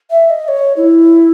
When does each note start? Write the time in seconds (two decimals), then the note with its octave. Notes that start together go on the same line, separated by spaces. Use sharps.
0.10 E5
0.29 D#5
0.48 C#5
0.76 E4